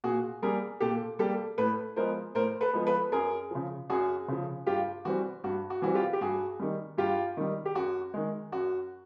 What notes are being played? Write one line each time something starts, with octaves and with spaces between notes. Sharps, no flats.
A#2 F#4 G#4
G3 A#3 G#4 A#4
A#2 G4 A4
G3 A#3 G4 A4
A2 A4 B4
F3 G#3 B3 A#4 C5
A2 A#4 C5
A4 B4
F3 G#3 B3
A4 B4
F#2 G#4 A#4
C#3 F3
F#2 F#4 G#4
C#3 F3
G2 F4 G4
E3 G3 C4 F#4
G2 F#4
F#4
E3 G3 C4 F#4
F4 G4
G4
G2 F#4 G#4
D#3 G3
G2 F4 G4
D#3 G3
G4
F#2 F#4
D#3 G#3
F#2 F#4